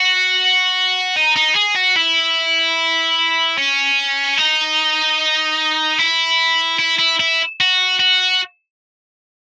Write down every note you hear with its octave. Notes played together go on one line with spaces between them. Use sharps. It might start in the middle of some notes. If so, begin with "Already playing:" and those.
Already playing: F#4
D#4
D#4
G#4
F#4
E4
C#4
D#4
E4
E4
E4
E4
F#4
F#4